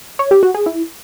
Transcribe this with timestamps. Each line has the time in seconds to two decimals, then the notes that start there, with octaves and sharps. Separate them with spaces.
0.19 C#5
0.31 G4
0.43 F#4
0.54 G#4
0.66 E4